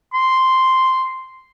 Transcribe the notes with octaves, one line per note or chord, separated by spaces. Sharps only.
C6